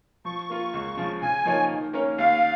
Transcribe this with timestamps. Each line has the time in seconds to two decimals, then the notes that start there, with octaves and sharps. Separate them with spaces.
0.25 F3 C#6
0.50 A#3 F4
0.74 C#2
0.97 C#3 F3
1.22 C#3 G#5
1.45 F3 A#3 D#4 C#5
1.69 D#3
1.93 A#3 C#4 A#4 C#5
2.18 D#2 F5